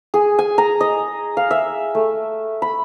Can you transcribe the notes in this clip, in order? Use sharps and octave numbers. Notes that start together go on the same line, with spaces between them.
G#4
G#5
A#5
D#5
F5
E5
A3
B5